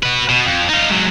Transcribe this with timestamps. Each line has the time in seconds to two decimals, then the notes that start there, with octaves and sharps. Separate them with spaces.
0.03 F#4 B4
0.29 B2
0.45 F2
0.69 D#4 F4
0.90 G#2 F#3